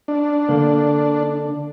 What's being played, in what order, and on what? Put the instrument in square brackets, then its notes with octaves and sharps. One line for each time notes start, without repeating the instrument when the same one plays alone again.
[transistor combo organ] D4
[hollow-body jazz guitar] D3 A#3